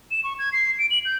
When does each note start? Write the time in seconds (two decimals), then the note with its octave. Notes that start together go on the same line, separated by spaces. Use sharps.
0.11 E7
0.24 C#6
0.39 G#6
0.53 C7
0.79 D7
0.91 F#7
1.05 G6